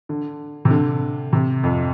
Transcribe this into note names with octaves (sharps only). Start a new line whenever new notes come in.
D3
C3
D3
C3
F2